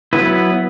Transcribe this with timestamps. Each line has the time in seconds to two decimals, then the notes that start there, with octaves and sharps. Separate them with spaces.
0.13 F#3 B3 E4 B4